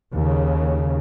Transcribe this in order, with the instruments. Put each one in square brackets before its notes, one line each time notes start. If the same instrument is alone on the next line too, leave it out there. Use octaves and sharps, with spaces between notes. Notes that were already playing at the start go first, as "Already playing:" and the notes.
[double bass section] D#2 C#3